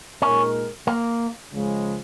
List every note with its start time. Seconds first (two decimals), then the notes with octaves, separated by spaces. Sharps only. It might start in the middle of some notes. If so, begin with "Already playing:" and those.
0.22 A#2 G#3 C#4 D#4 A#4
0.87 A#3
1.53 C#2 C#3 F3 G#3